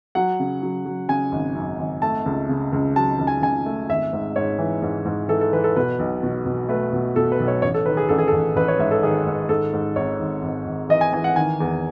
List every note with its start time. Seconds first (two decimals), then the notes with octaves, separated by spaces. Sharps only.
0.15 F#3 F#5
0.39 C#3
0.62 F#3
0.85 F#3
1.08 C#3 G#5
1.32 G#1
1.55 F#2
1.79 G#1
2.02 A3 A5
2.26 C#2
2.49 C#3
2.73 C#2
2.96 F#3 A5
3.19 C#2
3.27 G#5
3.42 C#2 G#5
3.66 A3
3.89 G#1 E5
4.13 G#2
4.36 G#2 C#5
4.59 E3
4.82 G#2
5.05 G#2
5.29 E3 A4
5.41 A4
5.53 E3 B4
5.64 A4
5.76 B2 B4
5.99 B1
6.23 B2
6.46 B2
6.69 A3 B4
6.93 B2
7.16 B2 A4
7.32 B4
7.40 B1
7.48 C#5
7.62 A1 C#5
7.74 A4
7.86 D#3 B4
7.97 G#4
8.09 A1 A4
8.18 G#4
8.28 A4
8.32 A1
8.55 A1 B4
8.68 C#5
8.79 G#2 E5
8.91 A4
9.03 D#3 G#4
9.27 G#2
9.49 G#2 A4
9.73 G#2
9.96 G#1 C#5
10.20 G#1
10.42 G#1
10.66 G#1
10.89 E3 D#5
11.01 G#5
11.13 E3 G#5
11.24 F#5
11.36 D#3 G#5
11.60 E2